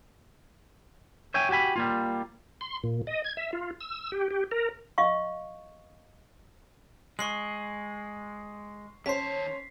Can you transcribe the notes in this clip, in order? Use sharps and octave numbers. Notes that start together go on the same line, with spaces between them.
C#5 E5 G5 G#5
F#4 G4 G5 G#5 B5
G3 A#3 F4
C6
A#2
D#5
G#6
E5
F4
E6
G4
G4
A#4
D#5 F5 C#6
G#3 C#6 C7 F#7
D#2 C#4 C5 A5 B6 C7